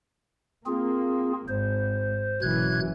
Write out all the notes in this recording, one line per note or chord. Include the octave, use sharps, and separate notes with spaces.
A#3 C4 F4 G#4
G#1 C5
F#1 F#2 B2 E3 F#6 G#6